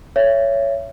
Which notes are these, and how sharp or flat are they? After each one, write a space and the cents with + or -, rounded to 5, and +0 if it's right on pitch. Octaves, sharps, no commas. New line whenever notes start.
C#5 +10 E5 +30